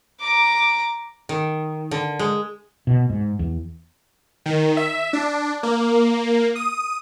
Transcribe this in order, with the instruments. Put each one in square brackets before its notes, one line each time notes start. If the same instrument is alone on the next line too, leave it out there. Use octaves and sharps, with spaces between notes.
[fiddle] A#5 D6
[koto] D#3
D3
G#3
[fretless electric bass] B2
G#2
E2
[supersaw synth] D#3
E5
D4
A#3
D#6